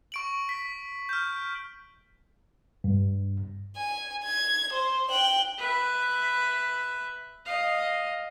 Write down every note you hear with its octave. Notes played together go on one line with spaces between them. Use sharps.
C#6 D7 F#7
B6
F6 G6
G2
G#5
G#6
C5
G5 F#6
B4 E5
D#5 F5